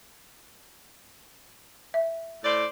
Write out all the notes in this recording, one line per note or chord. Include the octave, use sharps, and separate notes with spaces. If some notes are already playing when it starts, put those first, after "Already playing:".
E5
A2 C5 D5